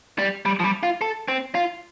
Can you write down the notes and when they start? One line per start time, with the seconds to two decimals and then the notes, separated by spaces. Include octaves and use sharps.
0.19 G3
0.45 G3
0.60 F3
0.64 G3
0.83 F4
1.01 A4
1.28 C4
1.55 F4